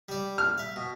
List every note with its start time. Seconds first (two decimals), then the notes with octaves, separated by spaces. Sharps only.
0.09 G3 D5
0.38 F6
0.58 E5 F5
0.76 B2